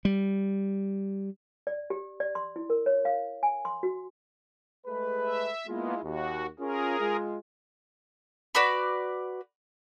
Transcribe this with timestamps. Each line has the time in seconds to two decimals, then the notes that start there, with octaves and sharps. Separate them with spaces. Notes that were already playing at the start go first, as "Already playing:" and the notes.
0.05 G3
1.67 D5
1.90 G4
2.20 D5
2.35 C6
2.56 E4
2.70 A#4
2.86 C#5
3.05 F5
3.43 G#5
3.65 C6
3.83 F#4
4.87 G#3 A3 B4
5.22 E5
5.67 G#3 A#3 B3 E4 F4
6.03 D#2 F#4
6.59 C#4 F4 G#4 A#4
6.99 G#3 F4
8.55 F#4 B4 D5 B5